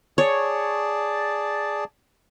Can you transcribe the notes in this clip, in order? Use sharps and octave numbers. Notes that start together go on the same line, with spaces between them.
G#4 C#5 D5 A5